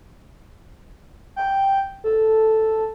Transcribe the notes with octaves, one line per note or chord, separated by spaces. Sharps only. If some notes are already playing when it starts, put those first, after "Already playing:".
G5
A4